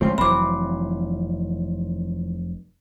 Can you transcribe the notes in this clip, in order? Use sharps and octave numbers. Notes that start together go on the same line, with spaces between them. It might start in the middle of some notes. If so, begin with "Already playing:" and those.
C2 F3 G#3 A3 C4 C#4
F1 E3 F#3 C4 B5 D6